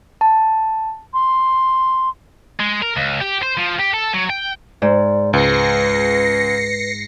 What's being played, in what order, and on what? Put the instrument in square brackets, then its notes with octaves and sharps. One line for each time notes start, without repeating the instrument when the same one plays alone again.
[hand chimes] A5
[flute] C6
[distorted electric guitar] G#3
A#4
C#2
G4
C5
F3
G4
A4
F#3
G5
[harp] G#2 [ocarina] D5
[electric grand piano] C#2 [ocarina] B4 [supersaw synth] A#6 C7 C#7